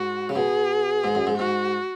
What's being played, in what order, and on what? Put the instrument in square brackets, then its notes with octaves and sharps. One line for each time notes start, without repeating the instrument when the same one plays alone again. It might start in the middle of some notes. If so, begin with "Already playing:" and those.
Already playing: [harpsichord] G#2 [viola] F#4
[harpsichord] C#3
[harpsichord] B2 [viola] G#4
[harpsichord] G#2
F#2
G#2
[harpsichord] G#2 [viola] F#4